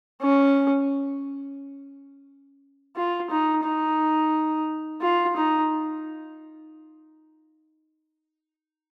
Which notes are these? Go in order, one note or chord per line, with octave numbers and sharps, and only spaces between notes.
C#4
F4
D#4
D#4
F4
D#4